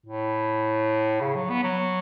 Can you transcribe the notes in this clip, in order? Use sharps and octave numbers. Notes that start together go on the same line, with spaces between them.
A2
C#3
F#3
B3
F#3